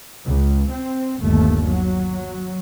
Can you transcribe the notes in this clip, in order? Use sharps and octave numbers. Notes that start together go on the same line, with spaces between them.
C#2
C4
G1 D#2 A3
F#3